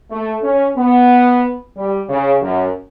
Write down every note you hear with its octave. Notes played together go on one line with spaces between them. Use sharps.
A3
C#4
B3
G3
C#3
F#2